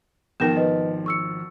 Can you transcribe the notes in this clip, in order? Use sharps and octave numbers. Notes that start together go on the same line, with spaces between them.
G#1 D#3 F3 B3 A#4 G5 A#6 E7
B4 D#5
C#6 E6 C#7